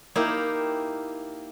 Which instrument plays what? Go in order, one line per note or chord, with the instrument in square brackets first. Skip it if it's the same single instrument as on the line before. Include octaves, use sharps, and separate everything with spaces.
[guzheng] A#3 D#4 E4 G4 F5